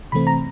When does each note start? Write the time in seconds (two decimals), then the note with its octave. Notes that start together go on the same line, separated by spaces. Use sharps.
0.12 C3 E3 A3 C4 B5
0.27 A#5